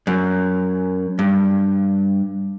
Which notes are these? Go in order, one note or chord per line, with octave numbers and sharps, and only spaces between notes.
F#2
G2